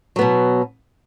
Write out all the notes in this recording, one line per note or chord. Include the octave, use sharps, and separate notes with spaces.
B2 F#3 B3